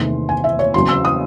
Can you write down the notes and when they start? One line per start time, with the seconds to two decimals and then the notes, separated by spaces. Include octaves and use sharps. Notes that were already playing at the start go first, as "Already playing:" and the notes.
Already playing: E2 C3 D#3 A3 C6
0.29 G#5
0.44 E5
0.59 C#5
0.74 E2 C#3 F#3 C4 C6
0.89 E6
1.05 D#6